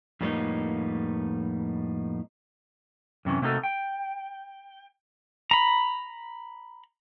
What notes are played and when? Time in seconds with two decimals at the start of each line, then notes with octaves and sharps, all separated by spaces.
0.21 F2 A2 G3 A#3 B3 D#4
3.25 F#2 C3 E3 C#4
3.42 C3 A3 A#3 D#4 F#4 A4
3.63 G5
5.51 A#5 B5